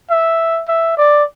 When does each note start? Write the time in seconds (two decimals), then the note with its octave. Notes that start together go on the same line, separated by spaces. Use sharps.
0.10 E5
0.68 E5
0.97 D5